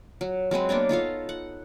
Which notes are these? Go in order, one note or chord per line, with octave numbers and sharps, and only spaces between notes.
F#3
F#3 G#3 C4 B4
A#3 B3 D4 C#5
D#4 F4 A4 F5
F#5